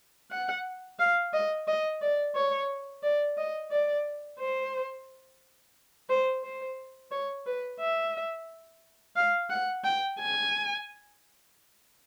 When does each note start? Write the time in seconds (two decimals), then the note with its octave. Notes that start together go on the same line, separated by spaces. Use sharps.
0.31 F#5
0.99 F5
1.33 D#5
1.67 D#5
2.01 D5
2.35 C#5
3.03 D5
3.38 D#5
3.71 D5
4.39 C5
6.09 C5
6.44 C5
7.11 C#5
7.46 B4
7.80 E5
9.16 F5
9.50 F#5
9.84 G5
10.19 G#5